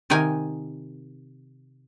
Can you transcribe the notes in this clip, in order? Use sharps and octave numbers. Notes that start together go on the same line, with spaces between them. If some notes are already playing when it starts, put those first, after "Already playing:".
C3 D#3 A#4 G5 G#5